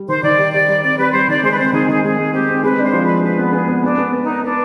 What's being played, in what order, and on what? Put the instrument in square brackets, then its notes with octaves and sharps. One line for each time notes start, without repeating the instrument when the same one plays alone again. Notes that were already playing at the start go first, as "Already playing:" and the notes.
Already playing: [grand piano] G3
[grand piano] D#3 [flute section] C5
[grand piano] D#3 [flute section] D5
[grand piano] G4
[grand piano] G4 [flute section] D5
[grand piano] G3
[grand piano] C4 [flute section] D5
[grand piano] G3 [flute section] B4
[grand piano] G3 [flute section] C5
[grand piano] D#3 [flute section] D5
[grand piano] G#3 [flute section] C5
[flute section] B4
[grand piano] C4 [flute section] C5
[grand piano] D#3 [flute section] G#4
[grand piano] D#4 [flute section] G#4
[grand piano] G#3 [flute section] G#4
[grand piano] G#3
[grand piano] C4 [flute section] G4
[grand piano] C4
[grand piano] G#3 [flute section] B4
[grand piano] D4 [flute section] C5
[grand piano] F3
[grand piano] D4 [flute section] B4
[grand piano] F3 [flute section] B4
[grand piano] B3
[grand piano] B3 [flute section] G#4
[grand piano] B3
[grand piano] B3 [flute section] D4
[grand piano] B3
B4
[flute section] D#4
[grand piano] B4
[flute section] D4 [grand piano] B4